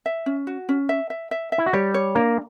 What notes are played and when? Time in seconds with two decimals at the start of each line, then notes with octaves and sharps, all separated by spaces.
0.06 E5
0.26 C#4
0.47 F#4
0.69 C#4
0.89 E5
1.10 E5
1.31 E5
1.52 E5
1.58 E4
1.66 F#4
1.73 G3 G4 C#5
1.94 C#5
2.15 A#3 D4 A#4